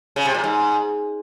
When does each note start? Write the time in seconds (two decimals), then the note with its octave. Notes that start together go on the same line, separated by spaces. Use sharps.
0.16 C#3
0.25 C3
0.34 A#2
0.44 G#2